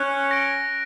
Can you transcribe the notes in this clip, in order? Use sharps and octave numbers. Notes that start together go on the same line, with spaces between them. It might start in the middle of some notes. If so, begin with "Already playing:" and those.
Already playing: C#4 F#6
A#6 D7